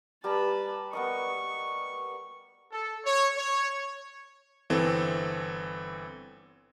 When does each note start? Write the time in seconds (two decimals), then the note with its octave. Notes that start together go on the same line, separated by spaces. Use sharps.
0.24 G3 B4 A5 A#5
0.93 B3 A#4 D#5 C#6
2.72 A4
3.06 C#5
3.37 C#5
4.70 G1 E3 C4 A4